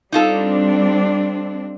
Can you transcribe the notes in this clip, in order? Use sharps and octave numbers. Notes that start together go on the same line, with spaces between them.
G3 C4 D4 D#4 F4 A4